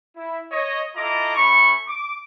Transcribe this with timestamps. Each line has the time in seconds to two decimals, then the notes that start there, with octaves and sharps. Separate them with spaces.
0.16 E4
0.51 C#5 D#5
0.96 E4 F4 A4 D#5 A#5 D6
1.36 A3 C#4 B5 C#6
1.86 D6